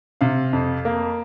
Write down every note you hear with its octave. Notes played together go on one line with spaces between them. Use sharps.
C3 F5
F2
A#3